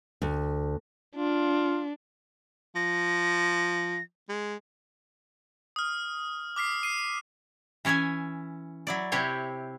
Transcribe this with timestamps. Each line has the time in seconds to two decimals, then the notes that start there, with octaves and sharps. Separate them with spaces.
0.22 D2
1.15 D4 F4
2.76 F3 A#6
4.29 G#3
5.76 D#6 F6
6.56 D6 F6 B6 C7
6.83 C7 D#7
7.85 E3 C#4 C#5 E5 G#5
8.87 F#3 E4 D5
9.12 C3 E4 G4 C5 C#5